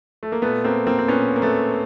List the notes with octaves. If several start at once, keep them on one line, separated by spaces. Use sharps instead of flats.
A3
A#3
A#2 A3 B3
A#3 C4
A#3 C4
C4
A#2 B3 C#4
A#3
A3 B3